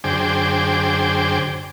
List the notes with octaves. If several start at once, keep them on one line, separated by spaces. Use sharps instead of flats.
F#2 D3 G#4 C5 G5 D6